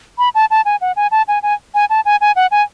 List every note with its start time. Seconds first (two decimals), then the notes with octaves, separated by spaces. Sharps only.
0.18 B5
0.35 A5
0.50 A5
0.65 G#5
0.81 F#5
0.96 G#5
1.11 A5
1.28 G#5
1.43 G#5
1.74 G#5
1.90 A5
2.05 G#5
2.21 G#5
2.36 F#5
2.51 G#5